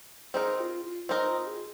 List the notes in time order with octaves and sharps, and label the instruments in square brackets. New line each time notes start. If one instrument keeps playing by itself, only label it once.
[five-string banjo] C4 D#4 A#4 [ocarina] G#4
[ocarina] F4
F4
[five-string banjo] C4 D#4 A#4
[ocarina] F4
G#4